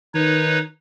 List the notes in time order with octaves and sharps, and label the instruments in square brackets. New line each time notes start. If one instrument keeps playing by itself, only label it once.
[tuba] D#3 [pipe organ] D#4 B4 C#5